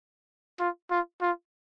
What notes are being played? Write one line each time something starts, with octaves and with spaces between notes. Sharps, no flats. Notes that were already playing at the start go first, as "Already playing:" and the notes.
F4
F4
F4